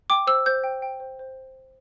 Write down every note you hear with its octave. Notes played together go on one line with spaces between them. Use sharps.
G5 D6
C5 E6
C5 G6
G5
G5
C5
C5